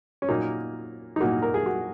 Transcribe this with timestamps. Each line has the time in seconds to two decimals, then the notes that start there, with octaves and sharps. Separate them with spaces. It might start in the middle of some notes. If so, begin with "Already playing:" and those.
0.22 C#4
0.29 A#2 F#3 A#3 D#4
1.16 D#4
1.20 A#2 F#3 A#3 F#4
1.42 A#4
1.54 G#4
1.66 F#4